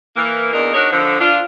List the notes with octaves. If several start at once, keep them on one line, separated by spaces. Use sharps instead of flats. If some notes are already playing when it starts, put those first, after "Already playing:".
E3 A#3
E2 D4 D#4 A#4
D4 D#4 F#4 A#4 C#5
D3 F3
D4 F4